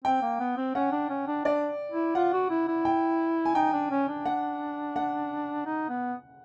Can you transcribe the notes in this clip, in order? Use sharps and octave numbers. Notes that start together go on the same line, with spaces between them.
C4 G5
A#3
B3
C4
C#4 F#5
D4
C#4
D4
D4 D5
E4
F4 F#5
F#4
E4
E4
G5
G#5
D#4 G5
D4
C#4
D4
F#5
F#5
D#4
B3